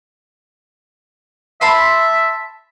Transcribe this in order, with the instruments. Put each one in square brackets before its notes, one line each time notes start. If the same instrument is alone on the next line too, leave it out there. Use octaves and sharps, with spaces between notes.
[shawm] E5 [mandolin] A5 B5 C6